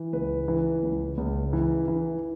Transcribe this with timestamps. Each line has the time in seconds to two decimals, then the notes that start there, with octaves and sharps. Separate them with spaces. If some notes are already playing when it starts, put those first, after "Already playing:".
Already playing: E3
0.13 C#2 B4
0.48 E3
0.83 C#2
1.18 C#2
1.53 E3
1.88 E3